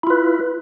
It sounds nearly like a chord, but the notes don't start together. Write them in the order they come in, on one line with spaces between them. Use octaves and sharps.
E4 F4 B4